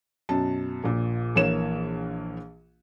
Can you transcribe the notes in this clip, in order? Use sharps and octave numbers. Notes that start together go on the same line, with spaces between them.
F#2 B2 A5
A#1 A#2
A#1 E3 A#3 C#5 E7